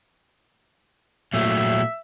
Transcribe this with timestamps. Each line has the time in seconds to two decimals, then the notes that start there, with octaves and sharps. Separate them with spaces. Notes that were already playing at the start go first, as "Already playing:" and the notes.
1.34 A#2 F#3 A3 E5